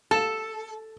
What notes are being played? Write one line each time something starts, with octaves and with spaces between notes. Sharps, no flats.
A4 A5